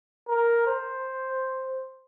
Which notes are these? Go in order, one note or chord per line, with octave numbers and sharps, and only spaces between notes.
A#4
C5